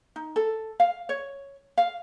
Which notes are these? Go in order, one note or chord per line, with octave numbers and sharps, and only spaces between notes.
D#4
A4
F5
C#5
F5